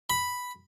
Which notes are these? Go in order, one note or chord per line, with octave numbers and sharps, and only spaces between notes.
B5